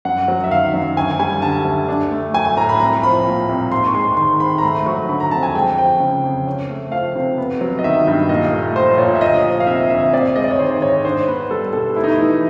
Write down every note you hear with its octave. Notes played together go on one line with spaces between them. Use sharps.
F#2 F#5
F#3
E5
D#3 F5
F#2
D2 G#5
G3 G#5
D3 A5
D2
D4
A3
F#3 G#5
G#5
A2 A#5
B5
C2 A#5
F3 B5
A#2
C2
G#2 C6
C#6
G#3 C6
D#3 C6
G#2 B5
A#5
A3 B5
F#3 C#6
D3 B5
A#5
F2 A5
G#5
G#3 G5
F3 G5
C#3
F2
C#4
A3
F3 F5
C3
B3
F#3
D#5
D#3 E5
G2
A#2 D#5
A3
F3 C5
A#2 C#5
E5
D2 D#5
F3
F5
C3 E5
D2 E5
C4 D5
G#3 D#5
D5
C#5
D#3 C5
G#2 C#5
D4 C5
B3 B4
G3 A4
B2 A4
A3 E4
D#4
E4
E3